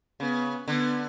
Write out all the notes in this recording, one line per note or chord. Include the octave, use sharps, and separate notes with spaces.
C#3 B3
D3 B3